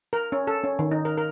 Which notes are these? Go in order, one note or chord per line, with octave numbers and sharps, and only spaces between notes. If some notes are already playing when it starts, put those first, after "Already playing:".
A#4
C#4
A4
C#4
D#3
D#4
A#4
A#4